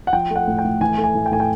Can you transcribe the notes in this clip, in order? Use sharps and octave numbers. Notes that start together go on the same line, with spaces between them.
F#5
F3 G5
A3 F#5
A2
G5
A2
E3 G#5
A3
G#5
A2
G5
A2 G#5
G5